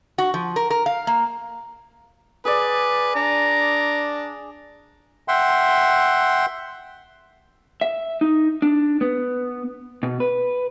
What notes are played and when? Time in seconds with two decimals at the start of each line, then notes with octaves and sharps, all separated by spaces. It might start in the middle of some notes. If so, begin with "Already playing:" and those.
0.18 F#4
0.34 F3
0.56 A#4
0.70 A#4
0.86 F5
1.07 A#3
2.45 G#4 B4 D5
3.15 D4 A#5
5.28 E5 F#5 G5 C6
7.81 E5
8.21 D#4
8.62 D4
9.01 B3
10.03 B2
10.20 B4